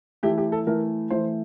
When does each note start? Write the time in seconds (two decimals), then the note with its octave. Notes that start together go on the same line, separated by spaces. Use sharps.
0.23 E3 A3 E4 G4
0.38 G4
0.52 A4
0.67 E3 A3 E4 A#4
1.10 E3 A3 E4 C5